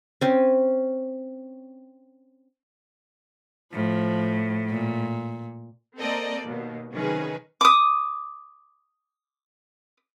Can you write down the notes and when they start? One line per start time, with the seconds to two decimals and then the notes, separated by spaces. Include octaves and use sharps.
0.21 C4 C#4
3.73 A2 F3
4.70 A#2
5.99 A#3 C4 A4 A#4 D5 D#5
6.45 D#2 B2
6.92 C3 D#3 F#3 C#4 G#4 B4
7.61 D6 D#6